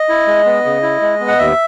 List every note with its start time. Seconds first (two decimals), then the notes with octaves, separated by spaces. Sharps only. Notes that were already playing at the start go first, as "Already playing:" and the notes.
Already playing: D#5
0.09 E4
0.27 G#3
0.46 B3
0.65 C#3
0.83 E4
1.01 G#3
1.20 B3
1.28 F#5
1.38 D#2 E5